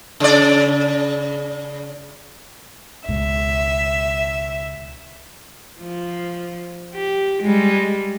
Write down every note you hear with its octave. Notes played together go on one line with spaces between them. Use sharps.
C#3 D5
C#2 B2 E5
F3
G4
G3 G#3